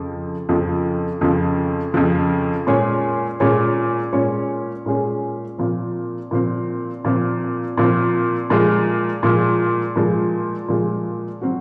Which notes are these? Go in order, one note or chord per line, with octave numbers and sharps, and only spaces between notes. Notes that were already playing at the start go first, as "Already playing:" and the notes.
Already playing: F2 C#3 F3
F2 C#3 F3
F2 C#3 F3
F2 C#3 F3
A#2 G#3 C#4 G#4 C#5
A#2 G#3 C#4 G#4 C#5
A#2 G#3 C#4 G#4 C#5
A#2 G#3 C#4 G#4 C#5
A#2 F3 C4
A#2 F3 C4
A#2 F3 C4
A#2 F3 C4
A#2 F3 G#3
A#2 F3 G#3
A#2 F3 G#3
A#2 F3 G#3
F#3 C4 F#4